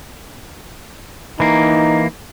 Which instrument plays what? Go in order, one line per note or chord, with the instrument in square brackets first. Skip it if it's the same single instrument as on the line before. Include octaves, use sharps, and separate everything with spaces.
[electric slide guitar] E3 A#3 [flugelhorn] D#4